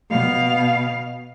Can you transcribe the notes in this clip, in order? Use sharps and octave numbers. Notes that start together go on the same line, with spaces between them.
B2 F5